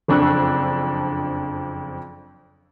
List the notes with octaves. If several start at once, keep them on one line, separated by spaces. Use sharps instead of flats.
F#1 F2 D4 C#6 E6 F#6